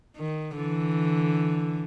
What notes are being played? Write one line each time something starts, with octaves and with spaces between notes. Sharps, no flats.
D#3
D3 E3